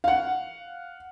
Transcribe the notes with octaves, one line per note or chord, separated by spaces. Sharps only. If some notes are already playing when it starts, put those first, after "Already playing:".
F5 F#5